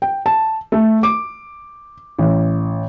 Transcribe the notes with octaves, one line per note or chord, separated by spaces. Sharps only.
G5
A5
A3
D6
A1